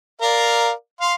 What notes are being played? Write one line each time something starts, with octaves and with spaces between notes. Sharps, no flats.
A#4 D5 F5
F5 C6